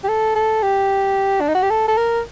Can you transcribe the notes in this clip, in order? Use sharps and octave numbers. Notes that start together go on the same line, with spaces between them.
G4
A4
A4
G4
D4
D#4
F#4
G4
A4
A4
A#4